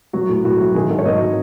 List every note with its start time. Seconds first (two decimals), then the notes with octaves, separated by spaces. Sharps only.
0.13 F#3 F#4
0.29 A2
0.44 A2 F#4
0.60 F#3
0.75 D#3 G#4
0.90 G#2 A4
0.99 C#5
1.05 F#3 D#5